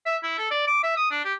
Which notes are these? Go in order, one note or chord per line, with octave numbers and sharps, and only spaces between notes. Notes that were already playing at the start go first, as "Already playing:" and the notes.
E5
E4
A4
D5
D6
E5
D#6
D4
G4